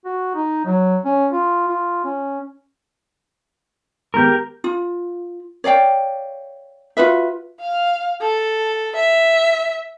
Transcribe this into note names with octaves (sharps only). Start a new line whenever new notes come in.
F#4
D#4
F#3
C#4
F4
F4
C#4
D#3 G#3 B3 G4 A#4
F4
C#5 D5 F5 G5
F4 F#4 B4 E5
F5
A4
E5